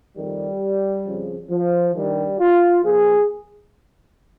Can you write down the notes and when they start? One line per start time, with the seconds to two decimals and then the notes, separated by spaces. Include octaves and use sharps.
0.17 F2 D#3 G3
1.06 F2 C#3 F3
1.50 F3
1.95 G2 D#3 G3
2.40 F4
2.84 A#2 F3 G#4